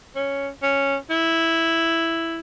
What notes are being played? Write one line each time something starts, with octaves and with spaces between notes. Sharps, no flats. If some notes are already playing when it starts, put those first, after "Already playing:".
C#4
C#4
E4